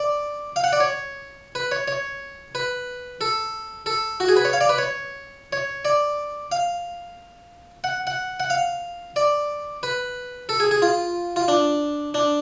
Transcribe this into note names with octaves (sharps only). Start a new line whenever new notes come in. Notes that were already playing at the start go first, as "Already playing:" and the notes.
Already playing: D5
F5
F#5
D5
C#5
B4
C#5
C#5
B4
A4
A4
F#4
G#4
B4
C#5
F5
D5
B4
C#5
C#5
D5
F5
F#5
F#5
F#5
F5
D5
B4
A4
G#4
G#4
F4
F4
D4
D4